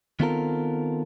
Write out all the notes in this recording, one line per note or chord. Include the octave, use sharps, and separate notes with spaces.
D#3 B3 C4 F4 A4 A#4